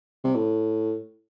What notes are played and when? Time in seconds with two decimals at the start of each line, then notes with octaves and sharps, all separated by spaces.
0.24 C3
0.35 A2